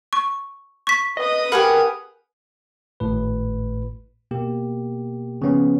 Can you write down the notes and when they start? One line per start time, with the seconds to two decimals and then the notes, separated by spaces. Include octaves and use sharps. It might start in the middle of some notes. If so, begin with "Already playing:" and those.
0.13 C#6
0.87 C#6 B6
1.17 B4 D#5 D#6
1.52 G4 G#4 A#4 F#5 B5
3.00 G#1 A2 B4
4.31 B2 A#3 G4
5.42 C#3 F3 B3 C#4